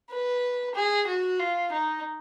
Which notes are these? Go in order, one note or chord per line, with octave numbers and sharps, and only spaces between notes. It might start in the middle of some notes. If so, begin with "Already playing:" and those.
B4
G#4
F#4
F4
D#4